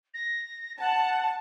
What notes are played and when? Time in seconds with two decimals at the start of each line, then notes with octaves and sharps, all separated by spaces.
0.14 A#6
0.80 F#5 A5